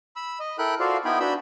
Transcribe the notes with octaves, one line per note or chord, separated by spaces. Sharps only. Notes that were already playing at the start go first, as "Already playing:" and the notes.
B5 E6
D#5
E4 A4 A#4 G5 B5 F#6
F4 F#4 A4 C5 D5 F5
B3 D#4 E4 G5 G#5 B5
D4 F#4 B4 B5 E6 G6